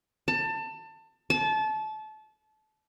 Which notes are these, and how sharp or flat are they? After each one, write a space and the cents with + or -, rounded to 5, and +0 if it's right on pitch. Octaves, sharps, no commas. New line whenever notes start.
A5 +25
A5 -25